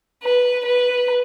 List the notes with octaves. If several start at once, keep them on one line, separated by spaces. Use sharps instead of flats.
B4
B4